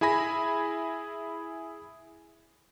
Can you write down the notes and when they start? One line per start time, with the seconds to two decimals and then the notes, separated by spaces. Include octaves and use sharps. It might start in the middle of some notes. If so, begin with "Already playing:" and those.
0.01 E4 G#4 G#5 B5 A#6